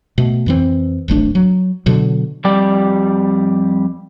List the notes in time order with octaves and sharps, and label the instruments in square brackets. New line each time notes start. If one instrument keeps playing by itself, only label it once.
[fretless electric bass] B2 A3
F2 E3 C4
D1 G#1 A3 D4
F#3
B2 D3 F#3
[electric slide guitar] F2 G3 G4 D5